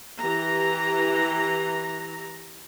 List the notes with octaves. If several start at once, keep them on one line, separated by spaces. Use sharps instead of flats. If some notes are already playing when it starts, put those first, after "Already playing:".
E3 G4 A#5